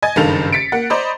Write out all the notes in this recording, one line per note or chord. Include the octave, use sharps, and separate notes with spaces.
D#5 G#5 A6
F#1 G2 D#3 A4 F5 F7
A6 B6 C#7 D7
A#3 F#5
C5 D5 D#5 A#5 B5